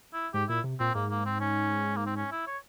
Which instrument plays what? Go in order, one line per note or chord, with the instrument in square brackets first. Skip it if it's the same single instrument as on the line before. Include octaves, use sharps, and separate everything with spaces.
[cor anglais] E4
[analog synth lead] G#2 [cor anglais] G4
[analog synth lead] A#2 [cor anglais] E4
[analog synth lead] C3
[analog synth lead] A#2 [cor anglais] C4
[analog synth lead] G#2 [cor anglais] A#3
[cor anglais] A#3
C4
C#4
A#3
C4
C#4
E4
C#5